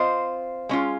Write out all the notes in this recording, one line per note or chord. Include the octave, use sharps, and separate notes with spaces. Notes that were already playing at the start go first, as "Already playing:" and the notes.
Already playing: C4 F4 C5 D#5
G#3 C#4 F4